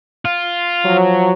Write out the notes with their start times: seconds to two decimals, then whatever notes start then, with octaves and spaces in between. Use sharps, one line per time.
0.25 F4
0.86 F3 F#3